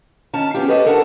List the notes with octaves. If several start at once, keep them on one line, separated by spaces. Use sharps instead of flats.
D#3 C#4 A5
B3 C#4 F4 G4
G4 A4 B4 C#5 D#5
D4 A4 A#4 F#5 A5